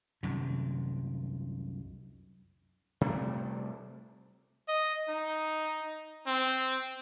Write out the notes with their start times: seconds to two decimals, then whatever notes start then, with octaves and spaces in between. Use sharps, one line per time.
0.23 C2 F#2 C3 D#3
3.01 C3 G3 A3
4.68 D#5
5.09 D#4
6.27 C4